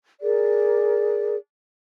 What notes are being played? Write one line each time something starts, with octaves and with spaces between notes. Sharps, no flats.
G#4 A#4 D5